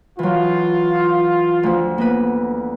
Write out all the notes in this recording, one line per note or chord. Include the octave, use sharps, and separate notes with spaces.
E3 F#3 F4
D2 F3
A#3 B3 B4